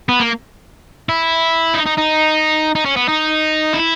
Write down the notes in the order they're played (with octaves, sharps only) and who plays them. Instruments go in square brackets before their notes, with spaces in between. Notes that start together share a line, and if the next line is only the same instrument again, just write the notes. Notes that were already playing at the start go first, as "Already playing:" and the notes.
[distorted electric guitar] B3
A#3
E4
D#4
D#4
D#4
D#4
C#4
B3
D#4
E4